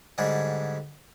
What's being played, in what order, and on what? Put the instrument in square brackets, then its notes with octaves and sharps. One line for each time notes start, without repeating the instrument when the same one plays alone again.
[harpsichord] G#2 D3 G3 G#3